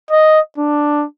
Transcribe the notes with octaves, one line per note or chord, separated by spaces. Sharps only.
D#5
D4